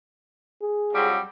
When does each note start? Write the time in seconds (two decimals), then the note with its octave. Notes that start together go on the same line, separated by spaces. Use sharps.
0.62 G#4
0.94 F2 F#3 G3